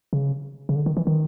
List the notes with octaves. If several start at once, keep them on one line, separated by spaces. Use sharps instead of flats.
C#3
C#3
D3
D#3
E3
D#3